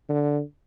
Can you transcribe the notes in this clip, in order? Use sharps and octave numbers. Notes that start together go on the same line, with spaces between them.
D3